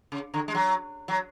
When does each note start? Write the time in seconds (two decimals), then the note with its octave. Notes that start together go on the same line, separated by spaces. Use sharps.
0.12 C#3
0.34 D3
0.48 G#3
0.55 F#3
1.08 F#3